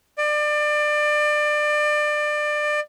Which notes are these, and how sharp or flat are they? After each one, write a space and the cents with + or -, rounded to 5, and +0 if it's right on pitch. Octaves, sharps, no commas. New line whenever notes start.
D5 +25